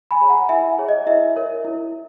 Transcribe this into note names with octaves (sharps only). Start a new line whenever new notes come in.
G#5 B5
G#4 C#5
F#5 A#5
E4 E5 G#5
G#4 C#5
D#5
E4 E5
A#4 C#5
E4